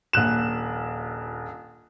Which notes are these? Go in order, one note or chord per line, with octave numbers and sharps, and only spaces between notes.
D#1 A#1 F#6 E7